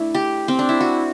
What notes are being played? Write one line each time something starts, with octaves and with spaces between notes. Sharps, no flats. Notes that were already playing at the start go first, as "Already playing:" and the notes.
Already playing: A3 D4 E4
G4
C4
D4
E4
F#4